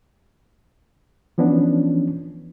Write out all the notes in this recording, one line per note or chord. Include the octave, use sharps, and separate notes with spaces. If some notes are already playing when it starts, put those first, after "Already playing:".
E3 F3 B3 C#4 D4